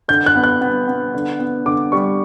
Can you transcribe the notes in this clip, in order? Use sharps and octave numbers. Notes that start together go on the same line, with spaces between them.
D3 G6
F#6
B3
F#6
B3
B3
D3
B3
D3 D6
G3 C#6